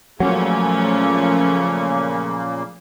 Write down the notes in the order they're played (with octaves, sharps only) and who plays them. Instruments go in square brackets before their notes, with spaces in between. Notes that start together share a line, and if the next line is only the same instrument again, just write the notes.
[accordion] A#2 C#3 A#3 [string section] F3 A3 C#4 [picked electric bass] F#3